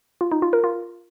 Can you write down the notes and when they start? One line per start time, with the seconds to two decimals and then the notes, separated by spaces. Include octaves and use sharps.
0.21 F4
0.32 D#4
0.42 F4
0.53 A#4
0.64 F4